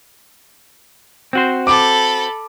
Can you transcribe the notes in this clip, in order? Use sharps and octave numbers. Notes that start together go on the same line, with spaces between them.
C4 F#4 C5
A4 B5 D6